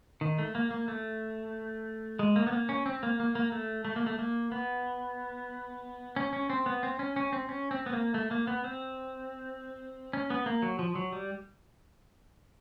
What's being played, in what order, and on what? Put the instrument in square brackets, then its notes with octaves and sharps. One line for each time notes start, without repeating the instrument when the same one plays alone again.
[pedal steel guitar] D#3
A3
A#3
A#3
A3
G#3
A#3
B3
A#3
C#4
C4
A#3
A#3
A#3
A3
A3
A#3
A3
A#3
B3
C#4
C#4
C4
B3
C4
C#4
C#4
C4
C#4
C4
B3
A#3
A3
A#3
B3
C4
C#4
B3
A#3
F#3
F3
F#3
G3